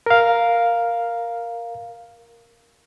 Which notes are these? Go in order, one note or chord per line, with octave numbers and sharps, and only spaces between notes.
A#4 F5